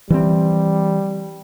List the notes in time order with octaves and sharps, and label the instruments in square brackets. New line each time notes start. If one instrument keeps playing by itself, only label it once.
[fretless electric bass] E3 C4 [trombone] G3